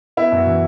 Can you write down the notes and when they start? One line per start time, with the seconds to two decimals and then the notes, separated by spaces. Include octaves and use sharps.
0.17 B3 E4
0.32 F#2 F#4
0.46 E3